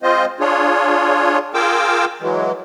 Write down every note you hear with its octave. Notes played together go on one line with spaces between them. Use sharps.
G#3 C4 F4 C5 D#5
D4 F4 G#4 C#5
F4 G#4 A#4 G5 D6 E6
E3 F#3 G#3